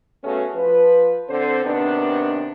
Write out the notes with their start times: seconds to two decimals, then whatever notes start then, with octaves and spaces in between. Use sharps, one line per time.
0.24 C#3 A3 B3 C#4 F#4 G#4
0.54 F3 B4
1.29 D3 C4 C5
1.64 C3 D#3 B3 D4